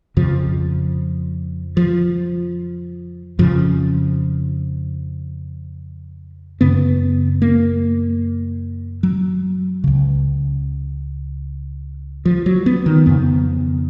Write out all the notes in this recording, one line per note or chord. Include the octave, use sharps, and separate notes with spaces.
F2 C#3 F3
F3
F2 C#3 F3
F#2 C#3 B3
A#3
F#3
C#2 C#3
F3
F#3
B3
D#3
F2 C#3 B3